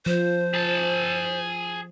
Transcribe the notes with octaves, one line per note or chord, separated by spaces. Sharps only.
F3 C5
G#4 A5